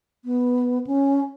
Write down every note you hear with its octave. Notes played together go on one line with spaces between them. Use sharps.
B3
C#4